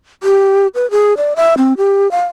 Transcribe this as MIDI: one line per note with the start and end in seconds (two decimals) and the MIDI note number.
0.23 0.67 67
0.75 0.89 71
0.91 1.14 68
1.17 1.33 74
1.36 1.54 76
1.58 1.73 60
1.77 2.10 67
2.11 2.24 77